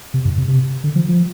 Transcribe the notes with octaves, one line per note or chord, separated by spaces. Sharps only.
C3
G2
C3
C3
D3
F3
F3